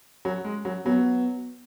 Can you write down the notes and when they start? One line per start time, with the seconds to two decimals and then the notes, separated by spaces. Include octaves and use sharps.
0.25 F#3
0.45 G#3
0.65 F#3
0.86 F#3 B3